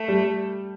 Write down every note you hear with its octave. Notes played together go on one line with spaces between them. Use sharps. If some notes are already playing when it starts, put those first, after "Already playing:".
Already playing: A3
G3